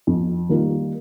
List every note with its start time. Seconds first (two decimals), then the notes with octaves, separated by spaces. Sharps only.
0.07 F2
0.49 D#3 G3 A#3 F4